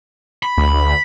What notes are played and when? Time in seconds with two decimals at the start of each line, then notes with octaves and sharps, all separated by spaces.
0.43 B5
0.57 D2